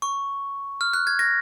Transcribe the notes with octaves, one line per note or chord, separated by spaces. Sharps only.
C#6
F6
F#6
G#6
A#6